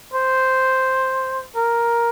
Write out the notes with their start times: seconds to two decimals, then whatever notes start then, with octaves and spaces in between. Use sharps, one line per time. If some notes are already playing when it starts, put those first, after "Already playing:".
0.13 C5
1.56 A#4